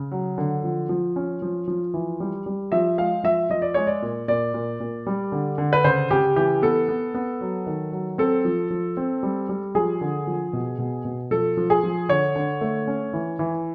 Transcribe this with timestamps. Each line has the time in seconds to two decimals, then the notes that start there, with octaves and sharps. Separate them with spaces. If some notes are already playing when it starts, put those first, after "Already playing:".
Already playing: C#3
0.11 F#3
0.38 D3
0.64 F3
0.89 F3
1.16 C#4
1.42 F3
1.68 F3
1.94 E3
2.20 G3
2.46 G3
2.72 F3 E5
2.98 G#3 F5
3.24 F3 E5
3.50 F3 D#5
3.62 D5
3.74 G#3 C#5
3.87 D5
4.02 A#2
4.28 A#2 D5
4.54 A#2
4.80 A#2
5.06 G3
5.32 D3
5.58 D3
5.73 B4
5.84 C#3 C5
6.10 C#3 G4
6.36 E3 G4
6.62 B3 A4
6.88 B3
7.14 B3
7.41 F#3
7.66 D#3
7.92 F#3
8.18 C4 A4
8.45 F3
8.70 F3
8.97 C4
9.23 G3
9.49 G3
9.75 F3 G#4
10.01 D3
10.27 F3
10.53 B2
10.78 B2
11.05 B2
11.31 F3 A4
11.57 F3
11.70 G#4
11.83 F3
12.09 D3 C#5
12.36 D3
12.61 A3
12.87 C#4
13.13 E3
13.39 E3